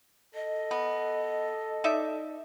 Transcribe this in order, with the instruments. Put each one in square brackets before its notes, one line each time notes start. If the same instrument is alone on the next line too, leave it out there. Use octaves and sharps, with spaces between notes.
[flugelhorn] A4 [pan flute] D#5
[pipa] B3
D#4 D5 E5